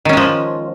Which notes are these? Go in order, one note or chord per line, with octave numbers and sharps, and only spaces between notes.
D#3 F3 G#3 C#4